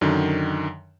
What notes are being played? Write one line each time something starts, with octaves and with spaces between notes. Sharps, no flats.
F#2 D3 D#3